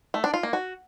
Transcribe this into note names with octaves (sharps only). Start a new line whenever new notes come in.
A3
D4
F4
A#3
F#4